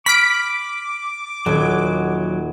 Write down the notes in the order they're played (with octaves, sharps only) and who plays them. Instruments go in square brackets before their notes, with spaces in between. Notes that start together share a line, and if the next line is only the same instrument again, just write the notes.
[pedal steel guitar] B5 F6 [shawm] D6 [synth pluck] B6 D7
[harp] D#1 [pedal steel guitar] F#3